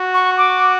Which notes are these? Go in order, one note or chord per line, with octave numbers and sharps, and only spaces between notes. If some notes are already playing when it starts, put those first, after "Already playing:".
Already playing: F#4
C#6
D6